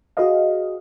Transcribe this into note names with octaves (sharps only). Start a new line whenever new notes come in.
F#4 G#4 B4 D#5 F5